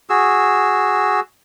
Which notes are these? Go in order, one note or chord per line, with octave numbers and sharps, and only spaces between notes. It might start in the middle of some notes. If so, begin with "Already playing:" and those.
F#4 G#4 E6